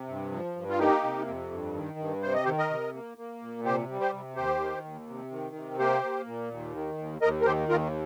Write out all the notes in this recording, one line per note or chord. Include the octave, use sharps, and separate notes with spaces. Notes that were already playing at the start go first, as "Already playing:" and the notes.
Already playing: C3
G2
F3
G2
F4
A#3 D#4 G4
C3
F2
G2
D#3
G2
C3 C5
D#5
D#3 G4 C5
A#4 D#5
C3
A#3
A#3
A#2
C3 G4 C5
G3
G4 C5
C3
D#2 G4 C5
D#3
D#2
C3
D#3
C3
A#3 G4 C5
A#3
A#2
D#2
D#3
D#2
D#2 A#4 D#5
A#4
D#3 G4 C5
D#2 F4 A#4